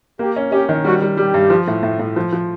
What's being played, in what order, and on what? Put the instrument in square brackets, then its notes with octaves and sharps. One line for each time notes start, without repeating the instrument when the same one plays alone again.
[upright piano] A#3 [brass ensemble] G4
[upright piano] C#4
[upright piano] C#4 [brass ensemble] G4
[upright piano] D#3
[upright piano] G3 [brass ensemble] F#4
[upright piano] G3
[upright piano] G3 [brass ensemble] G4
[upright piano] G2
F3
A2
A2
A2
F3
F3